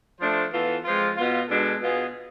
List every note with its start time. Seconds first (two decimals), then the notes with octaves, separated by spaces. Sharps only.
0.20 F3 A3 D4 A4 C5
0.52 E3 B3 F4 A4
0.84 F3 G#3 C4 F4
1.17 B2 B3 F4
1.49 B2 G#3 D4 A4
1.81 B2 B3 F4 G#4